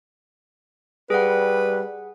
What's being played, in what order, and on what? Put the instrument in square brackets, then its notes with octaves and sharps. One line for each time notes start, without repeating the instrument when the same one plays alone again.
[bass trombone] G3 [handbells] G#4 F#5 [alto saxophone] B4